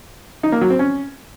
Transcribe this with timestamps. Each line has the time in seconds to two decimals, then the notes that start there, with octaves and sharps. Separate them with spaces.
0.43 D#4
0.52 A#3
0.61 F#3
0.70 C4
0.79 C#4